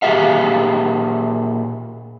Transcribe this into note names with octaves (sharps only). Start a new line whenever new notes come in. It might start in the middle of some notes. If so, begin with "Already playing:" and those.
A#2 G4 G#4 E5 F5